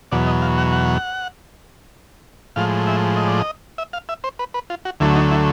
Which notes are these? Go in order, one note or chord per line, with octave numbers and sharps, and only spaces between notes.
E2 B2 F#3 D5
D#5
F5
F#5
F#5
A2 F3 G#3 F5
E5
D#5
D5
D#5
E5
F5
E5
C5
B4
B4
F4
F#4
D2 D3 F#3 A3 E4
D#4
E4